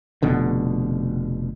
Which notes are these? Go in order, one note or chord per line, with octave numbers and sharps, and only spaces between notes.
F1 B2 D3